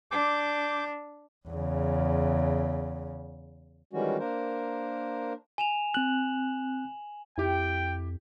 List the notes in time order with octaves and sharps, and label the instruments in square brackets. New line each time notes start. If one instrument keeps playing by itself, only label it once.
[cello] D4 [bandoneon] D6 G6
[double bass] E2 C#3
[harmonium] D#3 E3 G3 G#3 C#4 F#4
A#3 D4 A#4 C5
[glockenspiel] G#5 E7 F7
[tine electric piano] C4 F#6 [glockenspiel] F#7
[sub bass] F2 [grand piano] E4 G4 [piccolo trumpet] G5